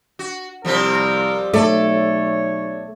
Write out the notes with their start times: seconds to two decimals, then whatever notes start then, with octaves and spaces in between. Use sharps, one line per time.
0.19 F#4
0.65 C2 F3 G3 C4 A#4
1.53 B1 A3 A4 C#5 D5